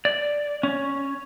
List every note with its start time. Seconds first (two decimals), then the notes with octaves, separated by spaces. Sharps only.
0.05 D5
0.63 C#4